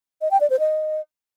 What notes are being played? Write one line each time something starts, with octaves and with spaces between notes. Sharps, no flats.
D#5
G5
D5
C5
D#5